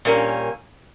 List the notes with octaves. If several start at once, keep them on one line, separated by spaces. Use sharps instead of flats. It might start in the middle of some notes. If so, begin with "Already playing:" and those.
A#2 G3 A#3 C#4